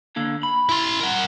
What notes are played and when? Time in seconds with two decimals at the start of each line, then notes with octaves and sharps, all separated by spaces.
0.16 D3 A#3 D4
0.43 B5
0.69 E4 C6
1.00 A#4 F#5